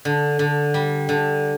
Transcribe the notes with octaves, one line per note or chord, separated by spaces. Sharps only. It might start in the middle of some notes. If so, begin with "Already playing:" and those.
D3
D3
G3
D3